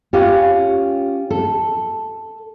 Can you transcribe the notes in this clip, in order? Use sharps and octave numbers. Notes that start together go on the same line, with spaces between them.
C#4 F4 G4
A4